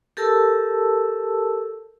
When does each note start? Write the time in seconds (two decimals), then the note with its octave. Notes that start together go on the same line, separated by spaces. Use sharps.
0.17 G4 A4 A#4 A5 E6